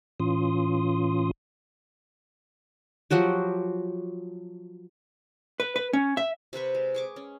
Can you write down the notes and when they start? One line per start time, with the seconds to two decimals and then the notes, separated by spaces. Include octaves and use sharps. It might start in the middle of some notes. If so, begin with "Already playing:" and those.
0.20 A2 E3 C#4 F4 C6 D#6
3.11 F3 F#3 F#4 G4
5.60 B4
5.76 B4
5.93 C#4
6.17 E5
6.53 C3 C4 B4 C#6
6.75 G#3
6.94 G#4 C#6 D6
7.16 C#4